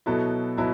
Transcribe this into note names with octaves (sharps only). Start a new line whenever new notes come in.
B2 F#3 B3 E4 A4
B2 F#3 B3 E4